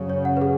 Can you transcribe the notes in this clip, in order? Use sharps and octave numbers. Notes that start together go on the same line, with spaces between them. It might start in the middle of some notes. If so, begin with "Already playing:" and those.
Already playing: F#2 C#3 F#3
C#5
F#5
B4
G#4